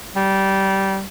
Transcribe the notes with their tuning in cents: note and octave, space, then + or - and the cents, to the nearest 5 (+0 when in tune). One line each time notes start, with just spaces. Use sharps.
G3 -15